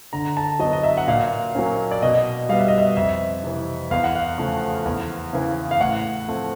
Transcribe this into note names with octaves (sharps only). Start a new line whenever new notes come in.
D3 A#5
A5
F#3 B3 D#5
D#5
E5
F#5
A#2 F5
F#3 A#3 C#4
D5
B2 D#5
G3 B3 F5
E5
D#5
E5
F2 E5
C3 E3
E2 F5
F#5
F5
C#3 F3 A3
E2
C#3 E3
F5
A2 F#5
F3 A3 C4